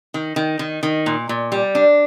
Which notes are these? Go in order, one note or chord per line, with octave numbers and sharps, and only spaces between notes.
D#3
D#3
D#3
D#3
A#2
A#2
G3
D4